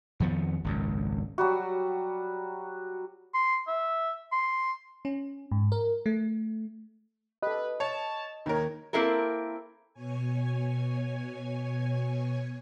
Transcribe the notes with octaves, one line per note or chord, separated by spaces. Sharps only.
F2 D#3 F3 B3
G#1 C#2 F#2
F#3 G3 F#4
C6
E5
C6
C#4
G#2
A#4
A3
G4 A4 B4 D#5
C#5 A5
D#2 D#3 D#4 A#4 C#5
A#3 C4 E4 A4 A#4
B2 C#5 G#5